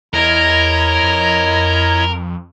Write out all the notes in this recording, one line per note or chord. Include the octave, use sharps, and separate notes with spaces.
E2 E4 A#4 C#5 D#5
F2